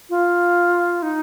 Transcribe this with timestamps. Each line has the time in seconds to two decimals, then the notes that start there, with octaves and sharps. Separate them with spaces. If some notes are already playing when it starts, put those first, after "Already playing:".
0.10 F4
1.03 D#4